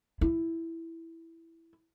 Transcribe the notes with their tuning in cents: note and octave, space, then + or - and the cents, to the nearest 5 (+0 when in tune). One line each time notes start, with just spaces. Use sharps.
E4 +0